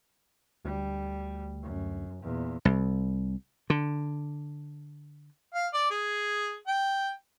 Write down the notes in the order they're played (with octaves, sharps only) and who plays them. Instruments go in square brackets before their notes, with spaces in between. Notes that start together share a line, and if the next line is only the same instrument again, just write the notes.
[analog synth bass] D2 [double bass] G3
[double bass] F#2
E2 A#2
[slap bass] C2
D3
[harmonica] F5
D5
G#4
G5